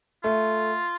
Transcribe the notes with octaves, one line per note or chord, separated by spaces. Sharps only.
A3 F4